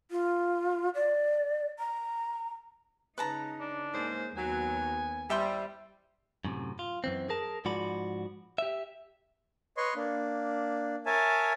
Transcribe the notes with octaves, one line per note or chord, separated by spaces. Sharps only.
F4
D5
A#5
C#3 D#4 B4 A5 A#5
D4
G#2 A#3 C#4 G#4 C5
D#2 F#3 B3 G#5
G3 E4 C5 E5 G5 C6
F#2 A2 C3
F4
F#2 E3 C4
G#4 A#4 A5
G#2 F3 F#4 D5 B5
G4 E5
B4 C#5 D#5 C6 C#6
A#3 D4
A#4 C#5 E5 G#5 A5